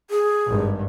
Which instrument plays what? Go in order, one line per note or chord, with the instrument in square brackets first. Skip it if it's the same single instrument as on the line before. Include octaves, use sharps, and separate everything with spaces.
[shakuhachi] G#4
[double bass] G#1 G2